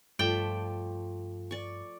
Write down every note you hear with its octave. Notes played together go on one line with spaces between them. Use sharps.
G2 F3 A3 D5 G5
D5 C#6